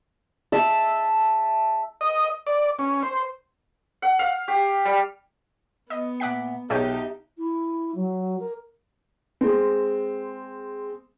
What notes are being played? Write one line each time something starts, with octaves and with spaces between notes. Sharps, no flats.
E5 A5 E6
D#5
D5
C#4
C5
F#5
F5
G4
G3
B3 D#5
A#2 E5 F#5 D6 F#6 B6
B1 D#4 G4 G#4 C#5 E5 G5
E4
F#3
A#4
G#3 C4